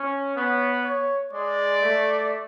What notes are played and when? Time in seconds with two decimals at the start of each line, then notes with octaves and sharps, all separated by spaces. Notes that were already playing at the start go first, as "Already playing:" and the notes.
Already playing: C#4
0.36 B3 C#5
0.84 C#5
1.33 G#3 D5
1.82 A3